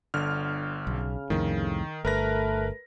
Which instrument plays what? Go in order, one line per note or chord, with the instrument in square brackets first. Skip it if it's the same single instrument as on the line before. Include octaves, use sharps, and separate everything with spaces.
[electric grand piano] G1 D3 F6
[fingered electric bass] B1 [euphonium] C#3
[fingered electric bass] C2 F2 A2 [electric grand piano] D#3
[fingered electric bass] G1 [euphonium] A3 [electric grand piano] A#4 B4 A#6